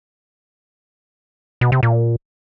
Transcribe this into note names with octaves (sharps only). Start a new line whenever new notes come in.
B2
C3
A#2